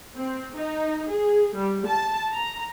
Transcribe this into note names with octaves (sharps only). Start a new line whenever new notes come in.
C4
D#4
G#4
G3
A5
A#5